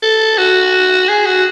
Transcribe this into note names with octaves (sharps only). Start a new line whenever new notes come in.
A4
F#4
G#4
F#4